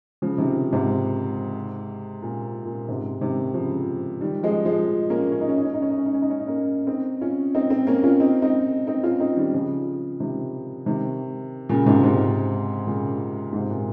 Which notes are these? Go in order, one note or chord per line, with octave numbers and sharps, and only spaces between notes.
C#3 F3
C3 D#3
G#2 C3
A#2
A#2
G#2 C3
C3 D#3
C#3 F3
D#3 G3
F3 G#3
F3 G#3
A#3 C#4
C#4
D#4
C#4
D#4
C#4
D#4
C#4
D#4
C#4
D#4
C#4
D#4
C#4
D#4
A#3 C#4
C4 D#4
C#4 F4
C4 D#4
C4 D#4
A#3 C#4
C#4 F4
C4 D#4
C4 D#4
C4 D#4
C#4 F4
C4 D#4
D#3 G3
C#3 F3
C3 D#3
C3 D#3
A#2 C#3
G#2 C3
G#2 C3
A#2 C#3
G#2 C3
A#2